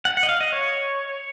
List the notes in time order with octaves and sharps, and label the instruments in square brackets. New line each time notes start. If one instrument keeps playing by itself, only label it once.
[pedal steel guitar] F#5
F#5
D#5
F5
D#5
C#5